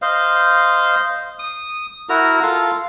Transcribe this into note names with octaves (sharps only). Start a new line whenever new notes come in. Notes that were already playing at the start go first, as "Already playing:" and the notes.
C5 D#5 F5
D#6
E4 F#4 A#4 A#5
F4 A4 F5